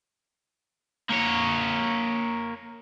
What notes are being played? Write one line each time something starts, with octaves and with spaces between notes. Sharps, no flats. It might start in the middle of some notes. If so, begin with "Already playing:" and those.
A#3 C#5